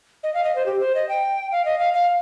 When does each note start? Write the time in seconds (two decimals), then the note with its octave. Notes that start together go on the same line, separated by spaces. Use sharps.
0.23 D#5
0.34 F5
0.44 D#5
0.55 C5
0.66 G4
0.80 C5
0.95 D#5
1.09 G5
1.52 F5
1.65 D#5
1.79 F5
1.93 F5